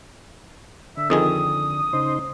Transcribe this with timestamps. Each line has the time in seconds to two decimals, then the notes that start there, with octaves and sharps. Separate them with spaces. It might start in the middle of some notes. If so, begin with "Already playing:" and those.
0.97 D3 E5
1.10 F2 D#3 G#4 D#6
1.93 C#3 D#4 C5